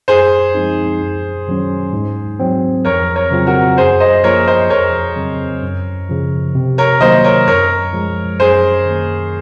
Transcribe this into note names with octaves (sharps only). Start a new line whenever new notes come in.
F#2 G#4 C5
F3 G#3 C4 D#4
F#2
D#3 F#3 C#4
G#2
F#3 C4
F2 A#4 C#5
A#4 C#5
C#3 F#3 C4 F4
F#4 A#4
F#2 G#4 C5
C5 D#5
F3 A#3 F4 A#4 C#5
C5 D#5
F2 A#4 C#5
C#3 F#3 C4
F#2
C#3 F3
C3
A#4 C#5
D#3 F#3 A#3 C5 D#5
A#4 C#5
F#2 A#4 C#5
F3 G#3
F#2 G#4 C5
D#3 A#3